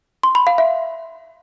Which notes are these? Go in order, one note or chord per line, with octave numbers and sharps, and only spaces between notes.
C6
B5
F5
E5